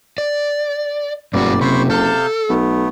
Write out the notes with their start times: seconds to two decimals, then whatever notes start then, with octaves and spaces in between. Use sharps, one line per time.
0.18 D5
1.34 F#1 G2 B2 G3 F#4 D5
1.61 C3 C5 B5 C#6
1.90 C3 A4 F5 G6
2.49 B1 A3 B3